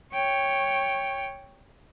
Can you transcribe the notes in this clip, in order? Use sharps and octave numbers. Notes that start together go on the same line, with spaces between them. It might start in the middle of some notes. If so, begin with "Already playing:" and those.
C#5 G5